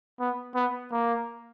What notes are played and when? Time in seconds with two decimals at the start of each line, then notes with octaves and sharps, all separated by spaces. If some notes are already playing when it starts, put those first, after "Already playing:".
0.20 B3
0.55 B3
0.92 A#3